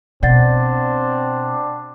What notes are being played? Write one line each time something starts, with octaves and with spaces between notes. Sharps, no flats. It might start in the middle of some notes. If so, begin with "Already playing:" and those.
B2 C4 D4 D5 F#5 A6